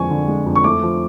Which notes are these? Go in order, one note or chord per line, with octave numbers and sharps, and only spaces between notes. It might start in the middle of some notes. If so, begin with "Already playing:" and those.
Already playing: F2 D3 F3 G#3 G#5 C#6
D3
G#3
F2
C#6
A3 D6
F3